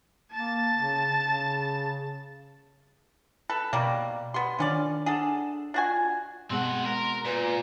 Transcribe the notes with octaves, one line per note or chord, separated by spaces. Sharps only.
A#3 A5 A6
C#3
C#3
A4 B4
B2 D#3 G3 A#3
B3 G4 B5 C6
D#3 F3 C#4 D4 D5 F6
D4 G#4 A4 F#5 E7
D4 F4 F#4 G#5
B2 G#3 C4 F#5 C6
A#4
A#2 B4